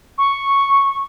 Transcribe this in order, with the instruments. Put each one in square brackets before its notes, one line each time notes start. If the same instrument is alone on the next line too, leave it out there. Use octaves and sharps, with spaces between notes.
[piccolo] C#6